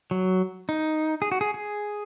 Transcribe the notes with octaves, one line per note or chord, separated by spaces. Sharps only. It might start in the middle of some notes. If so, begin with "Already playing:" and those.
F#3
D#4
G#4
F#4
G#4
G#4